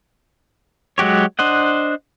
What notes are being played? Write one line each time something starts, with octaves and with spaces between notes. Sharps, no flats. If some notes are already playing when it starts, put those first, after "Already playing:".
F#3 G#3 F#4 G4 C#5
D4 C5 D#5 F#5